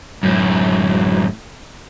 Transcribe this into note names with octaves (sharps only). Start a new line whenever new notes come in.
F#2 A2